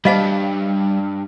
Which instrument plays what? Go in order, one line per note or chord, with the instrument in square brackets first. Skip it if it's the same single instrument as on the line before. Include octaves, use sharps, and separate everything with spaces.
[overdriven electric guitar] G2 [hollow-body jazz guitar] G3 [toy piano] D#5 F5 A5